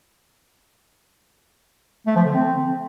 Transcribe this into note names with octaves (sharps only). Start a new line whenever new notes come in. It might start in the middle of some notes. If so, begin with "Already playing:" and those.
A3
F3
D3
C4